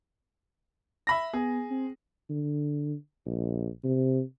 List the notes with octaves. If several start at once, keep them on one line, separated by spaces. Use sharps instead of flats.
E5 B5 A#6
B3 G#4
C4
D3
A#1
C3